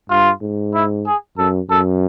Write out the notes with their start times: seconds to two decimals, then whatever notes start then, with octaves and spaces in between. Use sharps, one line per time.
0.10 G2 F4
0.42 G#2
0.74 E4
1.06 G#4
1.38 F#2 A4
1.70 F#2 A4